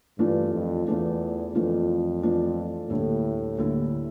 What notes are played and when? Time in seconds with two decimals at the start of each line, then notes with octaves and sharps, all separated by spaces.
0.18 G2 E3 A3 D4 F4
0.52 F2
0.86 E2 E3 A3 D4 F4
1.54 F2 E3 A3 D4 F4
2.23 E3 A3 D4 F4
2.89 D2 A2 D3 G3 A#3 E4
3.58 D2 D3 G3 A#3 E4